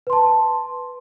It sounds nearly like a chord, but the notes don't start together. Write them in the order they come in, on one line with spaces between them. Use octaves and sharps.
B4 C6 A5